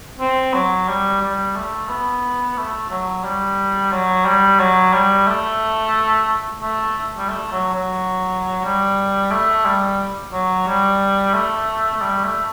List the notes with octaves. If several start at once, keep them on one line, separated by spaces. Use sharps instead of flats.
C4
F#3
G3
G3
A3
B3
A3
F#3
G3
F#3
G3
F#3
G3
A3
A3
G3
A3
F#3
F#3
G3
A3
G3
F#3
G3
A3
A3
G3
A3